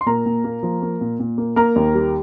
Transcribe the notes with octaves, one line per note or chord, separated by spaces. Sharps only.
C6
A#2 A#4 A#5
A#2
A#3
F3
A#3
A#2
A#2
A#3
A#3 A#4 A#5
D#2
G3